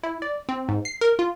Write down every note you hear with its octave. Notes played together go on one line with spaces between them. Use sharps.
E4
D5
C4
G#2
C7
A#4
F4